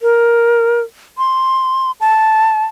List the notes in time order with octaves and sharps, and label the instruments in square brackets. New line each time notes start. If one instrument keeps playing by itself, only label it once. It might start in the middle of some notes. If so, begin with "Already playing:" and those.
[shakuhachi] A#4
C6
A5